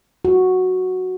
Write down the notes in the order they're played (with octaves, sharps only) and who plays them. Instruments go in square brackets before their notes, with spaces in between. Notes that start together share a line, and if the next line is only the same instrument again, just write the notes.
[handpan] F#4